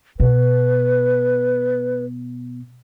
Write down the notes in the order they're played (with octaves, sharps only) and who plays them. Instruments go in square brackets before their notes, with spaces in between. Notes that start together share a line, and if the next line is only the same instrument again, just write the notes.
[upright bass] B2 [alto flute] B4